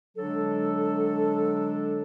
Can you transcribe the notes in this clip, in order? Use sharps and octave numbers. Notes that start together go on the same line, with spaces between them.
D3 F#3 G#3 D4 A4